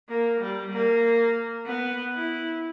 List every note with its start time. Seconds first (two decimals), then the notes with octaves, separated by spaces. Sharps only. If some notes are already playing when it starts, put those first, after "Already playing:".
0.08 A#3
0.40 G3
0.72 A#3
1.67 B3
2.14 E4